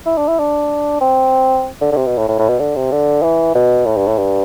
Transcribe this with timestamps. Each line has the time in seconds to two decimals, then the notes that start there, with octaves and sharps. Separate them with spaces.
0.06 E4
0.17 D4
0.28 E4
0.39 D4
1.01 C4
1.81 D3
1.92 D3
1.96 C3
2.07 B2
2.18 A2
2.28 A2
2.39 A2
2.49 B2
2.59 D3
2.76 C3
2.91 D3
3.23 E3
3.55 B2
3.86 A2
3.97 G2
4.07 A2
4.18 G2